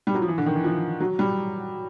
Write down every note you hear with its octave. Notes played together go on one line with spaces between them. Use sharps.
G3
F#3
F3
E3
D3
D#3
E3
F3
F#3
G3